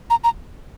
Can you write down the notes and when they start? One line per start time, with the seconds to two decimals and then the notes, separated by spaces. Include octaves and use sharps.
0.10 A#5
0.24 A#5